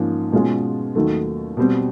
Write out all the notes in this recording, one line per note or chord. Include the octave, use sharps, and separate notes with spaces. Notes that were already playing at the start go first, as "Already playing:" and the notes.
Already playing: G#2 F3 A#3 C#4
B2 G#3 C#4 F4
D#2 D#3 F#3 A3
B2 G3 C4